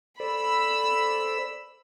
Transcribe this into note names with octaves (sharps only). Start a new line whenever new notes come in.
A4 C5 D5 B5 E6